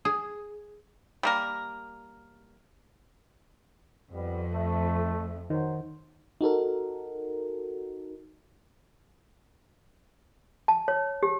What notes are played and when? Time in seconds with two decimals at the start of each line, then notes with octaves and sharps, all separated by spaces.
0.05 G#4
1.23 G3 A#3 A#4
4.13 F2 G3 B3
4.52 A3
5.50 D#3 F#3 F#4 C5
6.41 D#4 F#4 A4 A#4
10.68 A5
10.88 C#5
11.23 G4